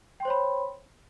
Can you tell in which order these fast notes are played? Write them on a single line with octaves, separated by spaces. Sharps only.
G5 C6 C5 C#5 B5